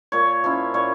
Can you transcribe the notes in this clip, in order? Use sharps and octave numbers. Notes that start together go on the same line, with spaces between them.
A#2 C#5
F3 C#4 E4
A#2 C#5